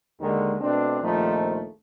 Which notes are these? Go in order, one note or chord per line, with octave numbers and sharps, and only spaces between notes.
D#2 D3 D#3 G#3
B2 A3 C4 D4
A#1 D#2 F3 A3 C4 D#4